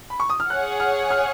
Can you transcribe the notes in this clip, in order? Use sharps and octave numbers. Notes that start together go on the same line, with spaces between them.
B5
C#6
D#6
F6
G#4 C#5 F#5 F#6
F6
F6